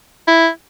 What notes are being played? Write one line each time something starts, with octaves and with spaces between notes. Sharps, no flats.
E4